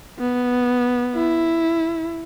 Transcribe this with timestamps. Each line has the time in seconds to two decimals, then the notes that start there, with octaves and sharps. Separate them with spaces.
0.19 B3
1.15 E4